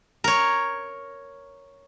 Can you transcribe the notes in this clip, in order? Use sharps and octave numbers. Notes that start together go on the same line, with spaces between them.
A#4 C#5